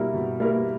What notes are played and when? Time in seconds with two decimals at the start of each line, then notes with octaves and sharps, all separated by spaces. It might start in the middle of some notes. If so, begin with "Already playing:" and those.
Already playing: B2 G3 A#3 E4 A#4
0.14 B2
0.40 G3 A#3 E4 A#4